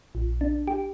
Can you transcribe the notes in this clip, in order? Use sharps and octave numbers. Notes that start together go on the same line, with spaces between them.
A#1
D4
G4